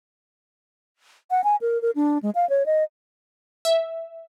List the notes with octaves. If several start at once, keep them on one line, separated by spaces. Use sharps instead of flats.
F#5
G#5
A#4
A#4
D4
G#3
F5
C#5
D#5
E5